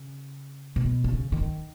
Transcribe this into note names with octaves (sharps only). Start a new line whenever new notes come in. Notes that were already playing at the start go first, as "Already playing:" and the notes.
Already playing: C#3
B2
C#3
D#3